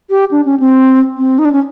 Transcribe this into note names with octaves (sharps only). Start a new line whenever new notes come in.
G4
D4
C#4
C4
C4
D#4
D4
C#4